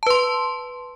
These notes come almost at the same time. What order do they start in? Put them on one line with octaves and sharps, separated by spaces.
A5 B4 C6